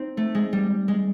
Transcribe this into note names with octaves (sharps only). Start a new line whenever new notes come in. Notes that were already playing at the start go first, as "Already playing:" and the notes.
Already playing: C4 D#4
A3
G#3
G3
G#3